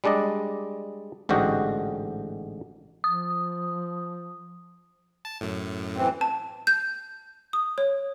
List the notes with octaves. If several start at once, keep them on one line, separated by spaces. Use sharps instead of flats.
G3 G#3 D4 D5 D#5
A1 G#2 D3 F#4 G4 D#5
F3 D#6
A5
F#2 A2
E3 C4
A5
G6
D#6
C#5